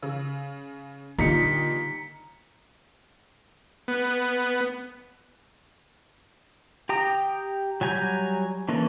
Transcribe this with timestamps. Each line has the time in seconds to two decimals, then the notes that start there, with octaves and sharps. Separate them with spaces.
0.03 C#3
1.19 A#2 D3 G3 D#4 A#5 B6 C#7
3.88 B3
6.89 G4 G5 A#5 D#6
7.81 F#3 G3 G#5 A#5 G6
8.69 E3 A#3 C#4 D4 A4